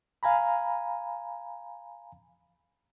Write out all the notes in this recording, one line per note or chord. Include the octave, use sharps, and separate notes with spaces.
F5 G#5 A#5 B5